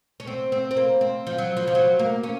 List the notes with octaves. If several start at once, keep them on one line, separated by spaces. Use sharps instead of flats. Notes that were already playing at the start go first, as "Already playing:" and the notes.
C#4
C4
C4
C4
A#3
C4
F3
F#3
F3
F3
F#3
A#3
C#4